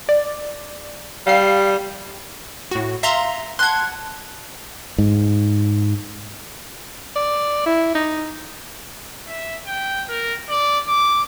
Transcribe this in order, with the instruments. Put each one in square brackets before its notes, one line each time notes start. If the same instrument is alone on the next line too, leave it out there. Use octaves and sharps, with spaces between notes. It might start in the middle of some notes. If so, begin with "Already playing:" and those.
[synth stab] D5
[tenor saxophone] G3 [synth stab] F5 C7
[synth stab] A2 F#4
[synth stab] E5 A#5 C6 [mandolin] F5
[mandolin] F#5 A5 F#6 [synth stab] C6 G#6
[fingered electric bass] G#2
[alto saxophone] D5
E4
D#4
[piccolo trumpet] E5
G5
A#4
D5
D6